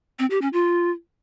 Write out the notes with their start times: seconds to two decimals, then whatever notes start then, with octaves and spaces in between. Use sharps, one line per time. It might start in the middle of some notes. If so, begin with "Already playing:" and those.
0.19 C4
0.30 G4
0.42 C#4
0.53 F4